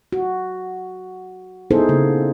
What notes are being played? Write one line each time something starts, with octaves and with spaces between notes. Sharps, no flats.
F#4
B3 D#4 E4 G#4 A4 C5
C#3 A#3